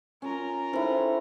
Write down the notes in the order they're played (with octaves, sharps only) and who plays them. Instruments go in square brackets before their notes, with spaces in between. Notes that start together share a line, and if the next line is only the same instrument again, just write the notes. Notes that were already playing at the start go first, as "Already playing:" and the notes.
[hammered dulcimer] C#4 [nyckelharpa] F4 A#4
[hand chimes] D#4 C5 [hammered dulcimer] E4 G4 A4